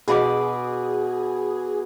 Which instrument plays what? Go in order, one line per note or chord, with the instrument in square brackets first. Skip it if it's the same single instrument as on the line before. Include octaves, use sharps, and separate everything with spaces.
[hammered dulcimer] B2 B5 D6 [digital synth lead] G#4